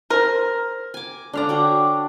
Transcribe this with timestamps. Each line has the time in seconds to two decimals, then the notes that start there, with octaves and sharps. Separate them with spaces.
0.10 A#4 C5
0.94 G#5 D6
1.33 D3 D4 D5 F5 A#5
1.49 F#4 G5